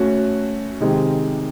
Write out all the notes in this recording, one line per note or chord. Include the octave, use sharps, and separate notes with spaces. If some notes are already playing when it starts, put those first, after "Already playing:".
Already playing: A3 C#4 F#4
C3 D#3 G#3 C4